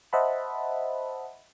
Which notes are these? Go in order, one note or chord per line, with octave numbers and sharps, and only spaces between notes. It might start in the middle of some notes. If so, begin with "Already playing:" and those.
C5 D#5 E5 F#5 A5 B5